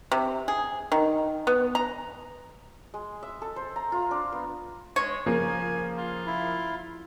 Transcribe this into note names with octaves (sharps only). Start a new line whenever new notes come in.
C3
G#4
D#3
B3
A#5
G#3
E5
A4
C5
A#5
F4
D4
B3
G#3 C#5
C#3 F3 A#3 G#5
F4
E4